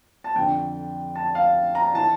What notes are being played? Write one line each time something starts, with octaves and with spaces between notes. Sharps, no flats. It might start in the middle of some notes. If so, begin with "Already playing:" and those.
A5
F2 D3 G5
A5
F5
A#5
E3 A5